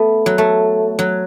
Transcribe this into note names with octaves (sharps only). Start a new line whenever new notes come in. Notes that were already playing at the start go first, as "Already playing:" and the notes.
Already playing: A3 B3
F#3
A3
F#3